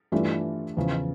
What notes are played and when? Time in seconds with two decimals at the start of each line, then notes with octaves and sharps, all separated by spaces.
0.12 G2 E3 A3 D4 F4
0.77 E2 C#3 F3